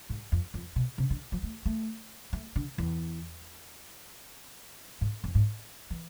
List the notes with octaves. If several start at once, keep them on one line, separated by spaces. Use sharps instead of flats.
G#2
F2
F2
B2
C3
D3
F3
A3
A3
A3
D3
E2
G#2
F2
G#2
E3